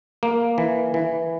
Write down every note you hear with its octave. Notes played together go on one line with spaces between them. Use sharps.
A#3
E3
E3